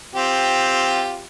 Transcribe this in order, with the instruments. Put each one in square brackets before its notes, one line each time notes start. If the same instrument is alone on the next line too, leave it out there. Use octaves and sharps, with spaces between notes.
[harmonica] C4 F4 G4